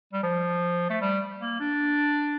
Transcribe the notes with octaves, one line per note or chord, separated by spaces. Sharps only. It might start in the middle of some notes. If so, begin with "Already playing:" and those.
G3
F3
A3
G3
A#3
D4